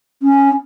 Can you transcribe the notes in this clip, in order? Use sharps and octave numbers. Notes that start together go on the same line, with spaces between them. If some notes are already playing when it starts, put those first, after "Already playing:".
C#4